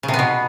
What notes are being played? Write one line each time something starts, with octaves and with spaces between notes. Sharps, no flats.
C#3
C3
B3
B2